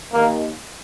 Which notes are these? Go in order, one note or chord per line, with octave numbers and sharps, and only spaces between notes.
D#2 D#3 A#3